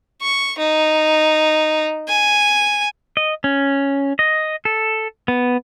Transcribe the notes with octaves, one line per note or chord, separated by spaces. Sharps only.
C#6
D#4
G#5
D#5
C#4
D#5
A4
B3